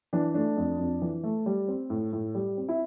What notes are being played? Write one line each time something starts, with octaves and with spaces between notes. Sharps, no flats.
E3 D4
A3 D4
F2
F2
E3
A3
G3
C4
A2
A2
G3
C4
E4